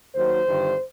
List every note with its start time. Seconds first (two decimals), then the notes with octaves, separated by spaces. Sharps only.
0.15 D#2 D#3 F#3 C5
0.46 G1 G2 D#3